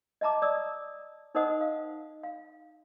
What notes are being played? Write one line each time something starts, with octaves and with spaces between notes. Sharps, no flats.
D#5 E5 A5 A#5 D6
D5 D#6 E6
D#4 A#4 C5 D#5 F#5 D#6
F5
F5